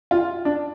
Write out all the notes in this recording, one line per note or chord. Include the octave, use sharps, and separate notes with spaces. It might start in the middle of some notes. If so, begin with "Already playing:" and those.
F4
D4